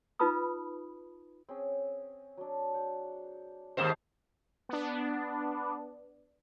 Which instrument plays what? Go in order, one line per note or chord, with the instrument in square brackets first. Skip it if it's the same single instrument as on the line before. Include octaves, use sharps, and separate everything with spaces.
[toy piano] D#4 F4 B4 A5 B5 D#6
[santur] C4 C#4 G#4
F#3 D4
C5 F#5
[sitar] D#2 G#2 C5 [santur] A3 C4 D5
[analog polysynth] B3 D4